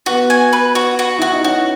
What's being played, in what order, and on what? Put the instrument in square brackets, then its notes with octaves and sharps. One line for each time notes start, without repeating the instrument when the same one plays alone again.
[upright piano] B3 [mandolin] F#4
[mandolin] G#5
B4
F#4
F#4
[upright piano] E4 [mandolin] F#4
[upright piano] D#4
[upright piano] C#4 [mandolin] F#4